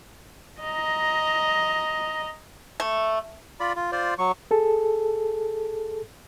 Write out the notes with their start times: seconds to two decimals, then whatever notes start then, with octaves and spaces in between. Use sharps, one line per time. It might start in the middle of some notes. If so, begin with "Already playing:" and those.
0.60 D#5 A#5
2.80 A3
3.60 F4 D5 B5
3.76 F4
3.92 F4 C5 D5
4.18 F#3 C#6
4.51 G#4 A4